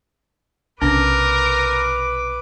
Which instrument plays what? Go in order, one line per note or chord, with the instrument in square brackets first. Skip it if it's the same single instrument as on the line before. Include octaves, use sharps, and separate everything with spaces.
[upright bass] B1 C3 [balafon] C#4 D4 [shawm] A#4 [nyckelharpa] B4 D6